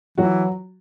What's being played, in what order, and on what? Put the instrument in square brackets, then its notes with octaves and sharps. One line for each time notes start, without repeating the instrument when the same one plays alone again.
[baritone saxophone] E3 [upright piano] F#3 F#4